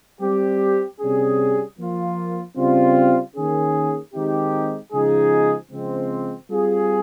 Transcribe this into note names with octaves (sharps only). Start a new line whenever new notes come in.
G3 C4 G4
C3 G3 C#4 G#4
F3 A#3 F4
C#3 G3 C4 F4
D#3 A#3 C#4 G#4
D#3 G#3 C4 D#4 G4
C#3 F3 G#3 D#4 G#4
C#3 F3 G#3 C4
G3 C4 F4 G#4